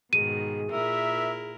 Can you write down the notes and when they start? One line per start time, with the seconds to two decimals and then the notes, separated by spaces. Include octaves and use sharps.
0.13 G#2 B2 D#3 G#4 D#7
0.72 A#2 E4 A#4 E5